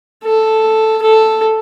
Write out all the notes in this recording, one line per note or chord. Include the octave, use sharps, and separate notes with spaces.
A4
A4